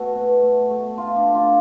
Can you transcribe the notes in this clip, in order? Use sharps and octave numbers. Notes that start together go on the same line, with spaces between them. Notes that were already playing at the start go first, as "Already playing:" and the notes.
Already playing: A3 B3 F#4 A4
B2
A3
A3
A3 F4
D4
A3
F4